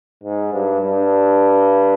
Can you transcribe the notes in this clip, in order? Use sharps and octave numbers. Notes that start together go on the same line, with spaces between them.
G#2
G2
G2